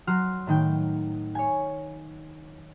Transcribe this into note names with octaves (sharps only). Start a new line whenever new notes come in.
F#3 F#4 C6 F6
A2 D#3 G5
C#5 G#5